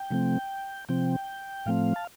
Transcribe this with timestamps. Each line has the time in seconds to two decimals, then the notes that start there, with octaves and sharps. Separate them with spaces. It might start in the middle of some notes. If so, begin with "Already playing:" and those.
Already playing: G5
0.10 C3 F3 A3 C4
0.89 C3 F3 C4 G5
1.66 A2 F3 A3 C4 F5
1.96 A5